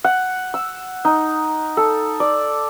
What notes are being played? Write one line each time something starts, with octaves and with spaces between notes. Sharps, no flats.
F#5
E6
D#4
A4
D5